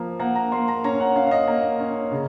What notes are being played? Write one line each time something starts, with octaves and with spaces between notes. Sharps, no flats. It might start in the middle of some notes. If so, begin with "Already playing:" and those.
Already playing: F3 A#3
A#3 F#5
A#5
A#3 C6
A#5
C#4 A#5
F#5
C#4 F5
F5
D#5
A#3
C#4
C#3